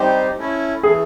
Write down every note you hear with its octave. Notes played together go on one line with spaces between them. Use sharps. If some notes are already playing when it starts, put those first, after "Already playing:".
Already playing: G3 C4 D#4 G4 C5
A3 C#4 E4
E3 A3 G#4